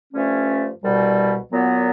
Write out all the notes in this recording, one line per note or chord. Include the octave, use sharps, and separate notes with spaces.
G2 D3 F3 A3 C#4
C2 B2 G3
A#2 F#3 B3